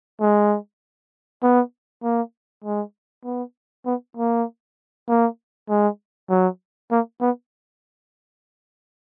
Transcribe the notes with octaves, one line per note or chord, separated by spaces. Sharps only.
G#3
B3
A#3
G#3
B3
B3
A#3
A#3
G#3
F#3
A#3
B3